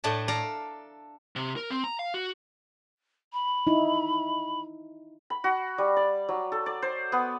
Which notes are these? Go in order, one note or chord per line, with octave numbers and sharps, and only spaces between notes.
A2 A3 D4 A5
A4 D5 F5 A#5
C3
A#4
C4
A#5
F5
F#4
B5
D#4 E4
B5
F#4
G3
D5
F#3
A4
D5
C5
B3